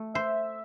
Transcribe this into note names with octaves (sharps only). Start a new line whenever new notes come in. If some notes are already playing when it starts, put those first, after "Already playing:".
Already playing: A3
C5 E5